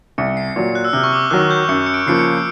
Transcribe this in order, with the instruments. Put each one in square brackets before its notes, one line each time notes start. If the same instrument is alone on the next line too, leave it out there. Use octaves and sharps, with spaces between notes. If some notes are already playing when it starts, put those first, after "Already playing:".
[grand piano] C2 [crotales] C#7
[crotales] C7
[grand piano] A#2 F#3
[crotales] F#6
E6
[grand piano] C3 [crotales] F6
[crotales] C#6
D6
[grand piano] D#3 F#3 [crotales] F#6
[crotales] G6
[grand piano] F#2 [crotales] C#7
[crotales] C#7
D7
[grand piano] C#3 F3 A#3 [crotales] C7
[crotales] C#7